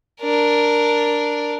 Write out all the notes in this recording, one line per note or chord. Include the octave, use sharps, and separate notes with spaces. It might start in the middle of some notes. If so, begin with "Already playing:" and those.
D4 A#4